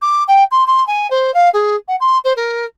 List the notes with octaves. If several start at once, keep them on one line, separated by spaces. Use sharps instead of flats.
D6
G5
C6
C6
G#5
C5
F5
G#4
F#5
C6
C5
A#4